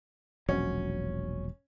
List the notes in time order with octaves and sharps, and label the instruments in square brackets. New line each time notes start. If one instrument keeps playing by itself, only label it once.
[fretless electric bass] E1 A#1 F#3 [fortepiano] C#4